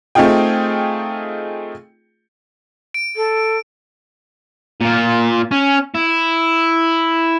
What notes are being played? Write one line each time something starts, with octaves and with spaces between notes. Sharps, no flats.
A3 C4 D#4 F4 G#4 G5
D7
A4
A#2 F4
C#4
E4